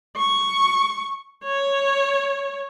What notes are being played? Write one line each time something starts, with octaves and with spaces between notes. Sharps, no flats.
C#6
C#5